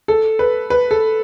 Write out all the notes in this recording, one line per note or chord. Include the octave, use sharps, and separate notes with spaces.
A4
B4
B4
A4